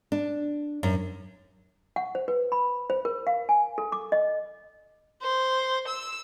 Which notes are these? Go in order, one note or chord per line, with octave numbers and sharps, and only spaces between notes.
D4
F#2
F#5
C5
B4
B5
C5
A#4
F5
G#5
A4
D6
D#5
C5
E6